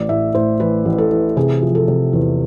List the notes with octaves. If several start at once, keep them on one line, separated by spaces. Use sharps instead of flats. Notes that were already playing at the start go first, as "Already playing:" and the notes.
Already playing: A1 D5
A2 E5
A2 C5
E3 B4
A1
A4
E3
C3 G#4
F3
A4
C3
E2